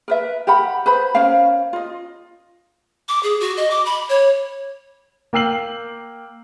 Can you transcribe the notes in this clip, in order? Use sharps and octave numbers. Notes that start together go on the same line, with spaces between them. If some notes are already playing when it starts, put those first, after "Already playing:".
A#4 B4 E5
G4 A#4 F#5 B5
B4 C5 B5
C#4 A#4 C5 F5
F4 D#5
D6
G#4
F#4
D#5
D6
B5
C#5
A#3 G5 E6 C7 F#7